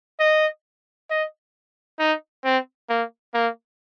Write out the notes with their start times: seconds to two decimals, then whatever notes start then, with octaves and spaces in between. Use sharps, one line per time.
0.20 D#5
1.10 D#5
1.99 D#4
2.44 C4
2.89 A#3
3.34 A#3